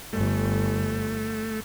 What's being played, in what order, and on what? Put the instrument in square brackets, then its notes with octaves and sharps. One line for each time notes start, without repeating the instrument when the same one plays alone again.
[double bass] G1 [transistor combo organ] A3